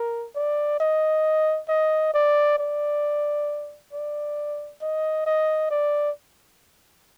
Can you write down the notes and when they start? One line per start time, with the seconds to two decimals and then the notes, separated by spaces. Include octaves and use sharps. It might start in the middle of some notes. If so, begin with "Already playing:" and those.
Already playing: A#4
0.36 D5
0.80 D#5
1.68 D#5
2.14 D5
2.58 D5
3.92 D5
4.81 D#5
5.26 D#5
5.70 D5